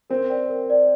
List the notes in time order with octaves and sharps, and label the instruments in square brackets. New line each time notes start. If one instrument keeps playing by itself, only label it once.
[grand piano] C4 [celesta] A#4
[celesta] D5 G5
A#4
D5 G5